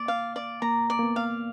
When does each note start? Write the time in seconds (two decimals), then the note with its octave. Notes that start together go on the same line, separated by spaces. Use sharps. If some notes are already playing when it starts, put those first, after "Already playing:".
Already playing: A#3 D5
0.08 F5
0.36 D5
0.62 A#3 A#5
0.90 D5
0.99 A#3
1.03 B3
1.16 F5